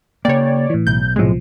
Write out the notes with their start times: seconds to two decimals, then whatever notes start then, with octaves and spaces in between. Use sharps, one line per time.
0.25 C#3 A#3 C#5 D5 G5
0.70 A2 E3
0.87 B1 G6
1.16 A2 C3 F3 G#3